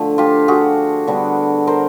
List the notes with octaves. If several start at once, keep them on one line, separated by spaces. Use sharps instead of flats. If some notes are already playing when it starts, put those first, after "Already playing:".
Already playing: D3 F3 A3
F4 G4
F#4 G#4
D3 G3 B3 D4
A#4 C5